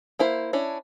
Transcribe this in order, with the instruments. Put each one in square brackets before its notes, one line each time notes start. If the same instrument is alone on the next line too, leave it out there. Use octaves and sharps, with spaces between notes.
[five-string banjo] A#3 E4 C5
C#4 D4 E4